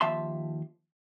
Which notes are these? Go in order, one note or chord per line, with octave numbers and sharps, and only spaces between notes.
D#2 F3 E5 A5 C6